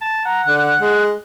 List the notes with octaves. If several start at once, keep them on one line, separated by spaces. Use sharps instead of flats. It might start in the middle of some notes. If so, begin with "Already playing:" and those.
A5
F#5 A#5
D3 F#6
G#3